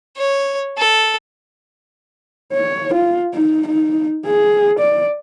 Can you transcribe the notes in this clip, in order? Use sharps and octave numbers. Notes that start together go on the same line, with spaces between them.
C#5
A4
C#5
F4
D#4
D#4
G#4
D5